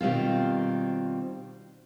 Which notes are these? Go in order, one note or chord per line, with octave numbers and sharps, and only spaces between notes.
B2 D#3 G3 C4 F4